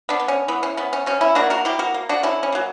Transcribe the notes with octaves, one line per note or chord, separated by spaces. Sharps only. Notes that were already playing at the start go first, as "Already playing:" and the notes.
B3 D4
B3
C#4
E3 B3
C#4
B3 C#4
C#4
B2 C#4
C#4 E4
A#3 D4 F#4
F#4 A#4
B2 E4 G4
F#4 A#4
A#3
D4 F#4
D3 C#4 E4
C#4
F#3 A#3